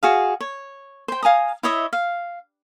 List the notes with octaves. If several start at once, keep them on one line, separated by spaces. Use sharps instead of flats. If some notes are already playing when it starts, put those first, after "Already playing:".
F#4 G#4 F5
C#5
C5 G5
F5 G#5 A#5 D#6
E4 C#5 D#5 E5
F5